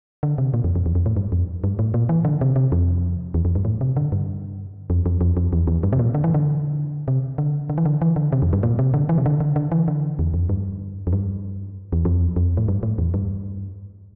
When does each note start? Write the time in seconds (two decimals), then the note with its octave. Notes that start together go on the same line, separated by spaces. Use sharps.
0.23 D3
0.38 C3
0.54 A#2
0.64 F2
0.75 F2
0.86 E2
0.95 F2
1.06 A2
1.17 G2
1.32 F2
1.64 G2
1.79 A2
1.94 A#2
2.09 E3
2.25 D3
2.41 C3
2.56 C3
2.72 F2
3.34 E2
3.45 F2
3.55 G2
3.65 A2
3.81 C3
3.97 D3
4.12 G2
4.90 F2
5.06 F2
5.21 F2
5.37 F2
5.53 E2
5.67 E2
5.83 G2
5.93 C3
5.99 A#2
6.15 D3
6.24 E3
6.34 D3
7.08 C3
7.38 D3
7.70 D3
7.78 E3
7.86 D3
8.02 E3
8.16 D3
8.32 C3
8.42 F2
8.53 G2
8.63 A#2
8.79 C3
8.94 D3
9.09 E3
9.18 C3
9.26 D3
9.40 D3
9.56 D3
9.72 E3
9.88 D3
10.19 E2
10.34 F2
10.49 G2
11.07 F2
11.13 G2
11.93 E2
12.05 F2
12.36 F2
12.57 A2
12.68 G2
12.83 A2
12.98 E2
13.14 G2